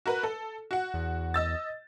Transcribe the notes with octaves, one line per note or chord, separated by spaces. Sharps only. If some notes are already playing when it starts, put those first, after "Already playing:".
F#4 A#4 B4
A4
F#4 F#5
E2
D#5 E6 A6